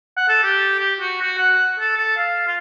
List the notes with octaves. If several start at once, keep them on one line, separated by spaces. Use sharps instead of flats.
F#5
A4
G4
G4
F#4
F#4
F#5
A4
A4
F5
F4